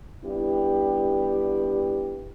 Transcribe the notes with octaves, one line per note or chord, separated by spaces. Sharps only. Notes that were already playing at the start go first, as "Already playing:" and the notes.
G3 B3 D4 E4 G4